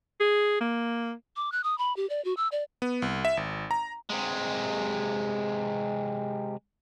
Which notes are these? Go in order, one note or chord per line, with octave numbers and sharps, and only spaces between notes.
G#4
A#3
D6
F#6
D#6
B5
G4
D5
F#4
E6
D5
B3
C2
E5
G#1
A#5
C3 G#3